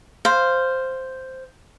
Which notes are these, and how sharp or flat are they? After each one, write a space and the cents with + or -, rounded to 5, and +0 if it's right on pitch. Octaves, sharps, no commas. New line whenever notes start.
C5 +0 F5 -5